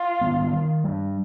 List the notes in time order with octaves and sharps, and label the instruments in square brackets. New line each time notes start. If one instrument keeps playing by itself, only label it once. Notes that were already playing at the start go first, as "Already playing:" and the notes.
Already playing: [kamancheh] F4
[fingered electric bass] D#3 G3 B3
D#3
G3 D4